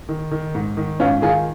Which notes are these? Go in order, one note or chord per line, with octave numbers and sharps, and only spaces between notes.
D#3
D#3
G#2
D#3
G#2 C#4 F4
D#3 F4 G#4